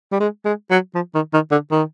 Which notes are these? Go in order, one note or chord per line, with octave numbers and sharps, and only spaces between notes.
G3
G#3
G#3
F#3
F3
D#3
D#3
D3
D#3